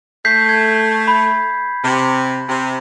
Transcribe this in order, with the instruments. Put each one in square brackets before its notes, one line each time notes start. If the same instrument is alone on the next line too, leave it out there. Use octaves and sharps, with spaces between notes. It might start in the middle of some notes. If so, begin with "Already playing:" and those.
[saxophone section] A3 [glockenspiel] G6 B6 C7
[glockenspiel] G#6
B5
[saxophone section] C3
C3